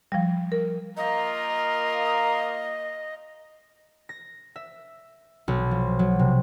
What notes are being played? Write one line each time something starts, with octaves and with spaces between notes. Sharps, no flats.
F3 G3
A#4
A#3 F4 A#4 D#5
A#6
E5
B1
F3
F#3
C3